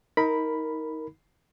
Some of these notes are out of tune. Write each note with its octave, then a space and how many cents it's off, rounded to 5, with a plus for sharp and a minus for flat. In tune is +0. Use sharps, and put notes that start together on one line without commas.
D#4 +30 A#4 +0 B5 +0